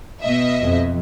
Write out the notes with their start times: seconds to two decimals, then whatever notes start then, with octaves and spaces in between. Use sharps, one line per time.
0.21 B2 D#5 E5
0.61 F2